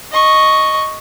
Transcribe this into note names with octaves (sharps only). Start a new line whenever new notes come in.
D#5 C#6